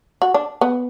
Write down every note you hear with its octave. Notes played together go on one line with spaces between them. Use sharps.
F#4
D4
B3